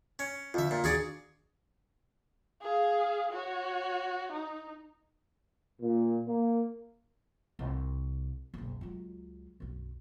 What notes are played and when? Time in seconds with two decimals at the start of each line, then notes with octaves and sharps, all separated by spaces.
0.19 C#4
0.54 F2 D3 F4 E5
0.71 A#2
0.84 D#2 D#3 D4 F#4 G#4 D5
2.62 G#4 F5
3.32 F#4 C#5
4.33 D#4
5.81 A#2
6.28 A#3
7.59 C2
8.54 F#1 B1
8.81 C#2 F#3
9.60 B1 F#2